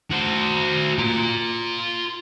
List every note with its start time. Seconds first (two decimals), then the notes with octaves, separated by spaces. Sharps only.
0.11 F#4 C5
0.98 F4 A#5